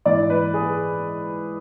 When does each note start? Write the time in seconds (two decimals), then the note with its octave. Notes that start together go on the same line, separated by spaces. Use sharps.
0.06 G#2 E3 D5
0.30 B4
0.54 G#4